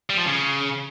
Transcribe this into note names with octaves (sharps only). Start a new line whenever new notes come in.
G3
F3
C#3